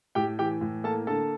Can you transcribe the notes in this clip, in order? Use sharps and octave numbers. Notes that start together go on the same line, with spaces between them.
A2 G4 G5
E3 G4 G5
A2
A#3 A4 A5
D3 A4 A5